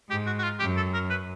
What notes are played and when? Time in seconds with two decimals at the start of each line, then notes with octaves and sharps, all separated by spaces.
0.09 G#2 G4
0.27 F#4
0.39 F#4
0.44 F4
0.60 F#2 G4
0.77 A4
0.94 A#4
1.10 B4